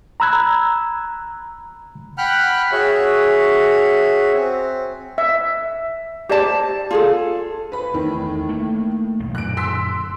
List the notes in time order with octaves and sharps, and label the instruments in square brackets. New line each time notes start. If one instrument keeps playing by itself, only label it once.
[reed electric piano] A#5 B5 E6 F#6 G#6
[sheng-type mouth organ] F#5 G5 B5 F6 F#6
F#4 G#4 C#5 E5
C4
[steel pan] E5
[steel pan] G4 D5 [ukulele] C5 A5
[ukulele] F4 G#4 A4
[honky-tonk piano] B4 B5
[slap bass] E2 [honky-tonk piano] A2 D#3
[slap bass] A3 A#3
B1 E2
[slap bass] F#2 A#2 D3 [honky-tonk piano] F#6 D7
[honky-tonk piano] C6 E6 B6